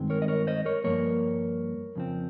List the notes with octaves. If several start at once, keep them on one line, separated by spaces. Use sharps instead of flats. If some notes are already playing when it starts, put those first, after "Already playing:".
Already playing: G2 D#3 G#3 C4
A#4 C#5
D#5
A#4 C#5
C5 D#5
A#4 C#5
G2 F3 A#3 A#4 C#5
F2 C#3 F3 C4